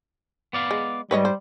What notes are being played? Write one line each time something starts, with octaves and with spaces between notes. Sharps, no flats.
B3 D5 F5
G#3
G#2 G3 B4 C#5 D#5
C5